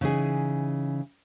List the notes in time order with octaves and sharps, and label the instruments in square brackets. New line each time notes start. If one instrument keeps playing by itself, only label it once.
[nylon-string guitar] C#3 E3 D#4 G#4